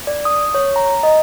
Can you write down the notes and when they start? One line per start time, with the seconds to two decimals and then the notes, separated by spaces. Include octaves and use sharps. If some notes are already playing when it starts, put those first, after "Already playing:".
0.07 D5
0.25 D#6
0.54 C#5
0.76 A#5
1.03 D#5